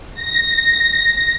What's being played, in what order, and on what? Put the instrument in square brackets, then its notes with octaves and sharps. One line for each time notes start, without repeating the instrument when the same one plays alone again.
[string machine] A#6